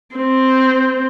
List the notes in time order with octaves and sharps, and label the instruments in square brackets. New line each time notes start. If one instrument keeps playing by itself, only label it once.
[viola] C4